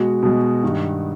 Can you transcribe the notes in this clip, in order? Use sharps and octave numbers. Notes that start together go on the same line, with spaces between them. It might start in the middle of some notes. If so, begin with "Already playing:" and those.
Already playing: B2 G#3 F#4 F#5
B2 G#3
G2 D#3 G3